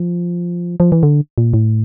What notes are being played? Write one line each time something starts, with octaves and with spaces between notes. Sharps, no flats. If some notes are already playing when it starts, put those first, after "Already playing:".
Already playing: F3
F3
E3
D3
A#2
A2